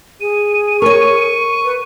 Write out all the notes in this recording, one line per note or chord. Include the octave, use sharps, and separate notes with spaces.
G#4 D#7
A#4 C#5 C#6
B4